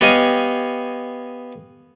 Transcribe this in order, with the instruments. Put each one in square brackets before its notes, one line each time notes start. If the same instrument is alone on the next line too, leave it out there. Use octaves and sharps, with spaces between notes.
[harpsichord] B3 G4 C#5 D#5 F5 G#5